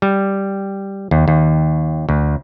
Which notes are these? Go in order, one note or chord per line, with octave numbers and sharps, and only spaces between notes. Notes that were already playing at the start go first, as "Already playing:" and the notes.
G3
D#2
D#2
D2